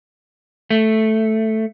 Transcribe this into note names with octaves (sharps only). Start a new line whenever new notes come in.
A3